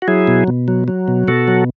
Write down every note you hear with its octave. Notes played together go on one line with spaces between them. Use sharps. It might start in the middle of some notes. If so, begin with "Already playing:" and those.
F#4
F#3 E4 G#4
B2
B2
F#3
F#3
B2
B2 F#4 A4
F#3